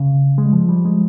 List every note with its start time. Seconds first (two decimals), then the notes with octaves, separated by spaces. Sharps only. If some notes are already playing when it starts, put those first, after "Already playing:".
Already playing: C#3
0.38 G#3
0.46 G3
0.53 F3
0.69 G3
0.85 G#3